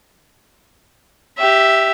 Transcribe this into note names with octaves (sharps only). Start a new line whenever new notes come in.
G4 E5